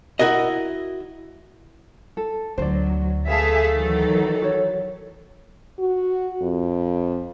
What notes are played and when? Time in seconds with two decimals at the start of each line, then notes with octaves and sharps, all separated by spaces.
0.19 E4 F#4 A#4 D#5
2.17 A4
2.58 D2 F#3 F4 C5 D5
3.27 A3 G#4 A4 B4 E5 F5 A5
3.74 D#3 E3 F#3
4.42 F#4 C#5
5.79 F#4
6.42 F2